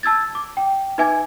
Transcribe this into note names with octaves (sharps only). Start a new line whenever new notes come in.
A5 E6 G#6 A6
D6
G5
D#4 B4 E5 G#5 D6 G#6